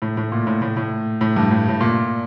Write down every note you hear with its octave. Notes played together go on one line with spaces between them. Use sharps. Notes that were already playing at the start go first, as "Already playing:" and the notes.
A2
A2
A#2
A2
A2
A2
A2
G2
A2
A2
A#2